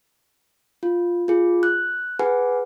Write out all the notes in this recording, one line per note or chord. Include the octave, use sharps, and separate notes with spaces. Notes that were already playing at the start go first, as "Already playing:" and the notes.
F4
F4 G#4
F#6
G#4 B4 F#5 G#5